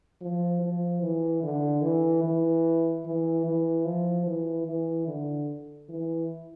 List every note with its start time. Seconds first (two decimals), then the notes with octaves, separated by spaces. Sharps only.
0.22 F3
0.62 F3
1.03 E3
1.43 D3
1.83 E3
2.24 E3
3.06 E3
3.46 E3
3.85 F3
4.27 E3
4.66 E3
5.07 D3
5.89 E3